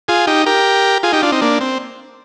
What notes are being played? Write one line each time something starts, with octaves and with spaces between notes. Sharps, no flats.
F4 G#4
D#4 G4
G4 A#4
F4 G#4
D#4 G4
D4 F4
C4 D#4
A#3 D4
C4